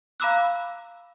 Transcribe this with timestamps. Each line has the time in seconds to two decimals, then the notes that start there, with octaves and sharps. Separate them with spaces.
0.20 F5 A#5 B5 D6 E6 F#6